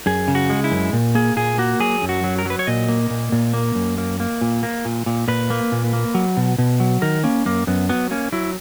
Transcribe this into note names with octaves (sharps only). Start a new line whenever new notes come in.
F#2 G#4
C#3
F#4
G#3
E4
F#2
A#2
A#3 G#4
A#2 G#4
A#3 F#4
F#3 G#4
F#2
F#4
F#3
A#4
F#3 B4
C#5
A#2 D#5
A#3
A#2
A#2
A#3
F#2
A#3
A#3
A#2
A#3
A#2
A#2
A#2 B4
A#3
A#2
A#3
F#3
B2
B2
F#3
D#3 A#4
A#3 C#4
F#2 A#3
F#2 B3
F#3 B3
A#3 C#4
F#3 E4